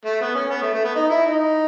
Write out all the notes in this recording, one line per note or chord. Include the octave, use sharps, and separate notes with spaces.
A3
B3
C#4
B3
A3
A3
B3
D#4
E4
D#4